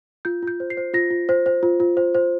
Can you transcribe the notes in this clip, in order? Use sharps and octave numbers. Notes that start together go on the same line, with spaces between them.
F4 G6
F4 G6
C5
C7
C5
F4 A#6
F4
C5
C5
F4
F4
C5
C5